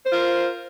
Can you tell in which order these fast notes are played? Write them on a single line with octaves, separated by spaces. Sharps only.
C5 F4 A#4